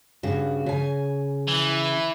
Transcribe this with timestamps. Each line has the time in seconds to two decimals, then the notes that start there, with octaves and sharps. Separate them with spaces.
0.23 G2 C#3 F#4
0.66 C#3 G#5
1.48 E3